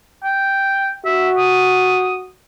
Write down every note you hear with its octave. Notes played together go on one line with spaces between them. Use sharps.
G5
F#4 E5
D#6